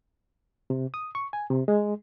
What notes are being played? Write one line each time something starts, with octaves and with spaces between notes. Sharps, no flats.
C3
D#6
C#6
G#5
C3
G#3